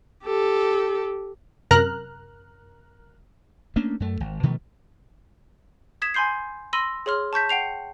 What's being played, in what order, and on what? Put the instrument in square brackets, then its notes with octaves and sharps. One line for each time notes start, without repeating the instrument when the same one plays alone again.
[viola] G4 A4
[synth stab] F#2 C3 A#4 A#5 F6 F#6
[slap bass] A3 A#3 C#4 D4
F#2 A3
G#1
B2 D#3 F3 A3
[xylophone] D#6 G#6 B6 E7
G#5 B5 C6 G6 C7
B5 C6 E6 A#6 D#7
G#4 C#5 C6 F6
A5 C#6 G6 B6
F#5 G5 C7 F7